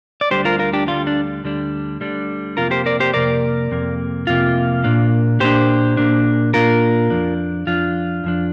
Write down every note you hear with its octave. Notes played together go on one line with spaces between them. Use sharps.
D5
D2 D3 G3 D4 G4 C5
F4 A#4
F4 A#4
D4 G4
D2 D3 G3 D4 F4
D4
D2 D3 G3 D4
D2 D3 G3 D4
F2 C3 A#3 F4 A#4
G4 C5
A#4 D5
G4 C5
F2 C3 A#3 A#4 D5
F2 C3 A#3
F2 C3 A#3 F4
A#2 A#3 D4
A#2 A#3 D4 G4 C5
A#2 A#3 D4
A#2 A#3 D4 F4 A#4
F2 F3 D4
F2 F3 D4 F4
F2 F3 D4